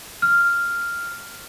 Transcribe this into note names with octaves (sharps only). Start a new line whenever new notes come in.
F6